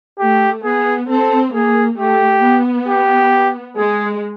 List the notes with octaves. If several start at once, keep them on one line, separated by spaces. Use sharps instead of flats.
A3 G4
B3 G#4
C4 A4
A#3 G#4
A3 G4
B3
G4
G#3 G#4